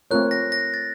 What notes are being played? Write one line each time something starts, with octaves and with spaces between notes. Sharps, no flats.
A3 C4 F4 A#4 C#5 F#6
A#6
A#6
A6